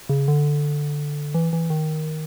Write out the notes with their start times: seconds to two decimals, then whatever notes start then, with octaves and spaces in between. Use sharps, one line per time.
0.09 C#3
0.28 D3
1.35 E3
1.53 E3
1.70 D#3